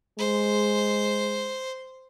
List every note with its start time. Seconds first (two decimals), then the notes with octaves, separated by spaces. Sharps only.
0.19 G#3 C5